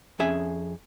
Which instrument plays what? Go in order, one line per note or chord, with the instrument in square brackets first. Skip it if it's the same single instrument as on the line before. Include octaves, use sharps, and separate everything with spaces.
[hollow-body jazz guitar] F2 C#4 G#4 E5 G#5